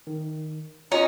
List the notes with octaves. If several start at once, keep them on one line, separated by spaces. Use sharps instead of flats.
D#3
C#4 D#4 F4 F#4 C#5 A#5